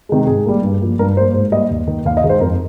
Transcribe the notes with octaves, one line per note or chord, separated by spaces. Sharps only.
C3 D#3 G#3
G#2 G#4
G3 A#3
G2
F3 A#3
G2 A#4
G3 A#3 C5
G#2 C5
G3 A#3 D#5
D#2
D#3 A#3
D#2 F5
D#5
D#3 G#3
C5
F2 A#4